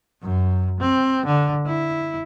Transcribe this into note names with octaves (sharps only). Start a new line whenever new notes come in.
F#2
C4
D3
E4